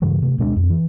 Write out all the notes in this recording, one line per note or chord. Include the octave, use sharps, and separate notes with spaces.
G2 C#3 E3 G3
C3 A3
D1 B2 G#3 D4
F2
E3